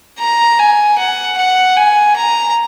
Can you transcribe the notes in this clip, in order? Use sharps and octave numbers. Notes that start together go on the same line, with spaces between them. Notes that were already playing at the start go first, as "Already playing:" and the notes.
A#5
G#5
F#5
F#5
G#5
A#5